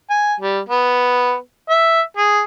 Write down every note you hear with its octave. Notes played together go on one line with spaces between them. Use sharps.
G#5
G3
B3
E5
G#4